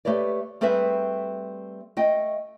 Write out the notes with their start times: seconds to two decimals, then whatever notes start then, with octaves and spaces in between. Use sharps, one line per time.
0.05 A3 G4 B4 C#5 D5
0.61 G3 A3 C4 G#4 B4 E5
1.97 A3 D#5 G5